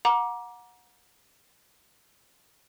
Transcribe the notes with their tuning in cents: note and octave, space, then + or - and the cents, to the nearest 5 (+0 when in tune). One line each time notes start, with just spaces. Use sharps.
F#5 -30 A#5 +25 D6 +0